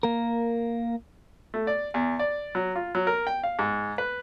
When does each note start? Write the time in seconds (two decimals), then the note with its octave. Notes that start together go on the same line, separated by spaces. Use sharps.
0.03 A#3 A#4
1.54 A3
1.67 D5
1.94 E2
2.19 D5
2.55 F#3
2.76 F4
2.95 F#3
3.07 A#4
3.27 G5
3.43 F5
3.59 G#2
3.98 B4